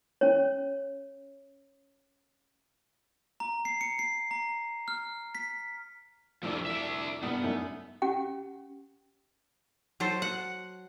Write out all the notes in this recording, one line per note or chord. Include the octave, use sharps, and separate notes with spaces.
C#4 C#5
A#5
C7
C#7
C7
A#5
F6
B6
F1 C2 F3 D4 G4 E6
D4 E5
C2 G2 B3
F#2 A3 D#4
C#4 G4 F#5 G5
F#3 A4 C5
F#5